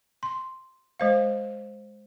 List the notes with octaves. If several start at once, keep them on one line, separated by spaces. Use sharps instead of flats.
C6
G#3 C5 F5